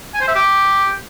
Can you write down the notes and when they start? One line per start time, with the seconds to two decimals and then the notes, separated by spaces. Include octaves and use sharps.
0.14 G#5
0.21 C5
0.28 E5
0.35 G4